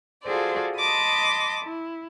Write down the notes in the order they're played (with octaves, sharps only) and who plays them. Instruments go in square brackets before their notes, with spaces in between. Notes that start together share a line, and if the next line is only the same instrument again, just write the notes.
[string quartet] F4 F#4 G#4 A4 C5 D5
D#5 A5 B5 C6 D6 D#6
E4